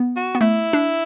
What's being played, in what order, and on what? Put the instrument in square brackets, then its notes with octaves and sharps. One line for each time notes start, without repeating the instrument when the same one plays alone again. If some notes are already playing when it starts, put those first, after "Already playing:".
Already playing: [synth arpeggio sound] B3
[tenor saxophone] F#4
[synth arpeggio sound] B3
[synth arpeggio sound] A3 [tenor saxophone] E4
[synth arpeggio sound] D4